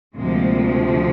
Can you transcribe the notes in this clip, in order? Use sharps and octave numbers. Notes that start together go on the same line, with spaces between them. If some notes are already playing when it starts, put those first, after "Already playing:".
D2 C3 F3 G#3 A#3